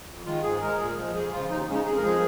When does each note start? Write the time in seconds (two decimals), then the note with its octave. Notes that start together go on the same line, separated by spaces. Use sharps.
0.09 F2
0.26 D#3 G#3 F4
0.43 G#2 G#4
0.61 G#3 A#4
0.79 A#2 G#4
0.97 F3 G#3
1.14 F2 G#4
1.32 C#3 F3 F4
1.50 D#2 D#4
1.68 C#3 G#3 C#4
1.73 D#4
1.85 F2 G#4
1.97 A#4
2.02 F3 G#3 G#4